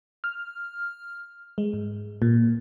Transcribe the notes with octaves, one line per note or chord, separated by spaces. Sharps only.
F6
G#3
G#2
A#2